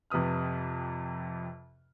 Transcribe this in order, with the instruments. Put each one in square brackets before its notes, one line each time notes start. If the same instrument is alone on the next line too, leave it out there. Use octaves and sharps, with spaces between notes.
[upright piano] F2 C3 B4 D#6 F6